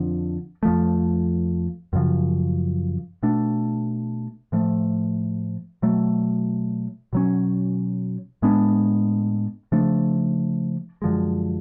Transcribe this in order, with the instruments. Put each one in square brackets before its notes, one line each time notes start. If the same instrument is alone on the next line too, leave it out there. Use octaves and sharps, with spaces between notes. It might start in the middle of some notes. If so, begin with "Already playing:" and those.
Already playing: [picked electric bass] F2 D3 F3
F2 F3 A3
F#2 C#3 F3
B2 A3 D4
A2 F3 A3
B2 F#3 A3
B2 F#3 C#4
A2 G#3 B3 D4
C#3 F3 A3 D4
F#2 D3 F3 G#3